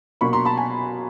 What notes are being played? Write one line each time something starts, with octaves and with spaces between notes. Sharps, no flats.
B2 F#3 A#3 D4 B5 C#6
A#5 C6
A5 B5
G#5